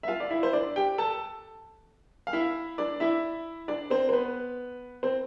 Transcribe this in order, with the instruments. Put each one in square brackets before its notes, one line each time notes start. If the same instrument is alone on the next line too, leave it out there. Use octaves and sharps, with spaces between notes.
[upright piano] E5
F4 F5
D5
E4 E5
C5
D4 D5
G4 G5
A4 A5
F5
E4 E5
D4 D5
E4 E5
D4 D5
C4 C5
C5
B3 B4
C4 C5